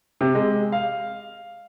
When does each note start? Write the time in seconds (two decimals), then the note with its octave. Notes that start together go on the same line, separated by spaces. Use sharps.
0.21 C3
0.35 G#3
0.72 F5